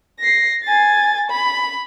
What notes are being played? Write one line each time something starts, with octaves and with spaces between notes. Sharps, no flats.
A#6 C7
G#5 A6
B5